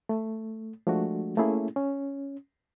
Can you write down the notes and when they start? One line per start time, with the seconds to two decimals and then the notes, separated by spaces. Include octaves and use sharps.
0.09 A3
0.87 F3 G#3 A3 D4 F#4
1.37 A3 A#3 C#4 E4 G#4
1.76 C#4